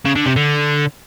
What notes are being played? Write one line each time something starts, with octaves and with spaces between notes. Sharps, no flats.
C#3
D3
C3
D3